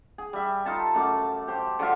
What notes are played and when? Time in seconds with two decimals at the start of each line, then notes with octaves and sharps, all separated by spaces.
0.18 G#4
0.33 G3 E5
0.66 D#4 F4 A4 A5
0.95 F#2 A3 D6
1.48 G4 C5
1.79 D3 F#3 F4 E5